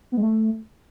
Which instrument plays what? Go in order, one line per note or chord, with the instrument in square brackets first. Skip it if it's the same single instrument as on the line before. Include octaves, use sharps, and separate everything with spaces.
[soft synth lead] B3
G#3
A3